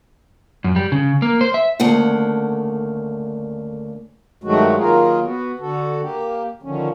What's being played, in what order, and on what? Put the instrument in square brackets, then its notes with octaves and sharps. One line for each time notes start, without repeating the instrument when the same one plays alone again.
[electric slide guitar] F#2
G3
C#3
A#3
C5
E5
[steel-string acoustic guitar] D2 C#3 A3 A#3 F#5
[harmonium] G2 D#3 F#3 G#3 A3 F#4
D#3 F#3 A#3 F4 G#4 A#4
B3 F#4
D3 F#4 A4
A#3 G4
D3 D#3 F3 C#4